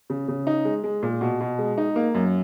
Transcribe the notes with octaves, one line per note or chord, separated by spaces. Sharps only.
C#3
C#3
D#4
G#3
G#3
A#2
B2
B2
G#3
D#4
A#3
F#2